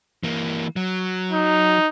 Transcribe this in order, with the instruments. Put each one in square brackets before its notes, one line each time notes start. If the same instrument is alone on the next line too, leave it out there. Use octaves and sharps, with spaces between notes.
[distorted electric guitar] E3 A#3
F#3
[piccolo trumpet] D#4